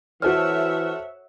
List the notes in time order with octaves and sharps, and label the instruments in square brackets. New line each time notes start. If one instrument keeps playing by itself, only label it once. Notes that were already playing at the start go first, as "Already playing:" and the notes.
[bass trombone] E3 [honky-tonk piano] F#4 A4 C5 [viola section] C#5 E5 F#5 [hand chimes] F6